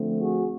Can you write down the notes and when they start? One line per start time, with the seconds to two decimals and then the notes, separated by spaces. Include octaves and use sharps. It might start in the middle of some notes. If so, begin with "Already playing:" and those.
Already playing: D3 F3 A3 C4
0.18 F#4 G#4